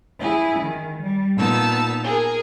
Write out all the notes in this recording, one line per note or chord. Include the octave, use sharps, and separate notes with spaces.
E4 G#4
D#3
G3
A#2 B3 D#4 A5 E6
G#4 A#4